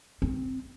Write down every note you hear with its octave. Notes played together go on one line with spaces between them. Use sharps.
C4